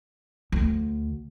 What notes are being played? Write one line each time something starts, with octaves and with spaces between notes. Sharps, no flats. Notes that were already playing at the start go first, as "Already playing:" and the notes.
D2